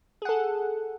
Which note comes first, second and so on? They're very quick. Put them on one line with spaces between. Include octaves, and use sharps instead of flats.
G#4 F#5 A4